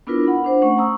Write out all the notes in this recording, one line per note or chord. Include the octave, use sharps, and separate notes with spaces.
B3 D4 E4 F4 A#4 B4
F#5 B5
D4 C5 F#5
A3 C#4 F#5 C#6
A#5 C#6 D#6 E6